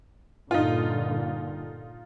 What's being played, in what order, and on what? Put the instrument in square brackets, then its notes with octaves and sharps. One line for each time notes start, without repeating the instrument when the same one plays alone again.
[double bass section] G2 A#2 D3 [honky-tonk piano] D#4 F4